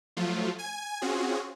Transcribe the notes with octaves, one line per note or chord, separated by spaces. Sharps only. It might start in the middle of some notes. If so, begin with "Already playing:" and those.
F3 F#3 A3 F4
G#5 G#6
C4 C#4 F4 F#4 G#4